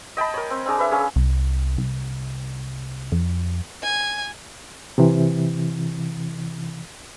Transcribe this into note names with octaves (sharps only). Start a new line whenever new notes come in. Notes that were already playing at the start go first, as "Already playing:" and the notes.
D#5 G5 A5 B5
A#4 C#5
C4
C4 D4 G#4 A#5
B4 E5
C#4 G#4 C#5 F5
C2
C2
F2
G#5
C3 E3